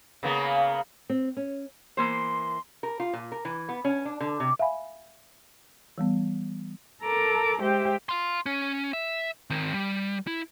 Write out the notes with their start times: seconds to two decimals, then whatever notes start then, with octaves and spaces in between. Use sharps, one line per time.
0.23 C#3 A#3 B3
1.10 C4
1.37 C#4
1.97 E3 A#3 C5 C6
2.83 A#4
3.00 F4
3.13 A#2
3.32 A#4
3.45 E3
3.69 B3
3.85 C#4
4.05 D4
4.21 D3
4.40 C3
4.59 E5 F5 G#5 B5
5.98 E3 G3 B3
7.02 A4 A#4 A5 A#5 D6
7.60 G#3 G4 C5 E5 G5
8.09 F5 C6
8.46 C#4
8.93 E5
9.50 D#3 C4
9.74 G3
10.27 E4